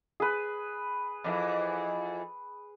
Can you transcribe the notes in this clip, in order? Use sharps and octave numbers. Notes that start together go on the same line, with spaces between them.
G#4 B4
F2 D3 E3